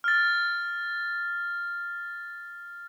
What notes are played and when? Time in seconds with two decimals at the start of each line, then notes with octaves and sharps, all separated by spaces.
0.04 F6 A6